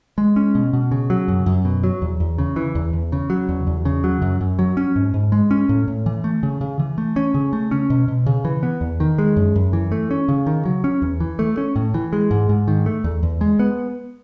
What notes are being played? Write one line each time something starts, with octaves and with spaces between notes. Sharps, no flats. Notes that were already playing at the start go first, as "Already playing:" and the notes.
G#3
C#4
B2
B2
C#3
F#3
F#2
F#2
B2
F#3
E2
E2
C#3
E3
E2
E2
C#3
F#3
E2
E2
C#3
F#3
F#2
F#2
F#3
C#4
G#2
G#2
G#3
C#4
A2
A2
E3
A3
C#3
C#3
E3
A3
C#4
C#3
A3
C#4
B2
B2
C#3
E3
B3
E2
D#3
G#3
F#2
F#2
E3
A3
C#4
C#3
D#3
F#3
C#4
E2
E3
A3
C#4
A2
E3
G#3
G#2
G#2
D#3
A3
E2
E2
G#3
B3